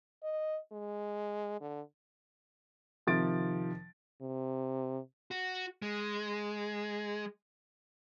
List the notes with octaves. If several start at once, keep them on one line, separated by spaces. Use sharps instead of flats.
D#5
G#3
D3
C3 D#3 F3 A6 D7
C3
F#4
G#3